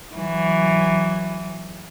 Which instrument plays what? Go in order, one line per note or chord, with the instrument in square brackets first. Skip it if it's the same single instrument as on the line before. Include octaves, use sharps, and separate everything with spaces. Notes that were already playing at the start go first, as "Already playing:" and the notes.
[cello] E3 F#3